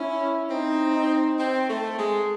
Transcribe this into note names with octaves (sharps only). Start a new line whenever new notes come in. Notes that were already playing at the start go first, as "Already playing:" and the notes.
Already playing: C#4 E4
C4 D#4
D#4
C4
A3
G#3